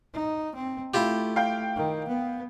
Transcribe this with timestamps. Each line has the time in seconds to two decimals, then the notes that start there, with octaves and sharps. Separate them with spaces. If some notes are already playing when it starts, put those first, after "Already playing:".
0.14 D#4
0.55 C4
0.94 A3 E4 F4 G4
1.36 F5 G5 G6
1.76 D#3
2.09 B3